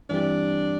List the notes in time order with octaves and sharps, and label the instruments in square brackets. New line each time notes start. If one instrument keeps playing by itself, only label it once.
[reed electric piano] G2 E3 G3 C4 G4 [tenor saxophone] D4